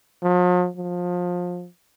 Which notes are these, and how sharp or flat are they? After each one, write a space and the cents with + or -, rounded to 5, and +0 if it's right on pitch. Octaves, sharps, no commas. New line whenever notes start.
F3 +45
F3 +25